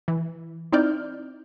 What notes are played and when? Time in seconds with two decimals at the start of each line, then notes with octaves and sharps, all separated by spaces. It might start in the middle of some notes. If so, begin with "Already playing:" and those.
0.08 E3
0.72 C4 D#4 E4 D5 F6 G6